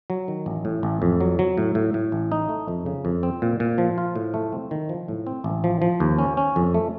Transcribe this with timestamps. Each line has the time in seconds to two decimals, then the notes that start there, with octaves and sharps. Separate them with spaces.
0.10 F#3
0.28 D#3
0.46 A1
0.65 A2
0.83 A1
1.02 F2
1.20 F#3
1.39 F#3
1.58 A2
1.75 A2
1.94 A2
2.12 A1
2.32 D#4
2.49 A3
2.68 F2
2.86 C#3
3.05 F2
3.23 C4
3.42 A#2
3.60 A#2
3.78 F3
3.98 F4
4.16 A2
4.34 A3
4.52 C4
4.71 D#3
4.89 F3
5.08 A2
5.27 C4
5.44 A1
5.64 F3
5.82 F3
6.00 D#2
6.18 C#4
6.37 C#4
6.56 F2
6.74 A3